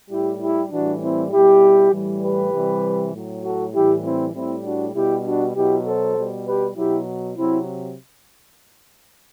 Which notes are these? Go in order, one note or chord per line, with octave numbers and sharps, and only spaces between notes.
A2 G3 E4 G4
E4 G4
A2 E3 G3 D4 F#4
C4 E4
B2 G3 E4 G4
A2 E3 G3
G4 B4
C3 E3 G3
A2 F#3
F#4 A4
A2 E3 G3 E4 G4
C4 E4
A2 G3 C4 E4
D4 F#4
B2 G3 E4 G4
D4 F#4
B2 F#3 E4 G4
A4 C5
B2 G3
G4 B4
B2 F#3 E4 G4
C3 F#3 C4 E4